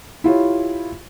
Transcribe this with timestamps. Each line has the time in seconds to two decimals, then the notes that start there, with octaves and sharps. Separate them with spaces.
0.24 E4 F4 G4 C#5